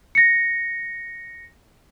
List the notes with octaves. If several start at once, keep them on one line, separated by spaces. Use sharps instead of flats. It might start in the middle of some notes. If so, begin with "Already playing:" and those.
A#6 C#7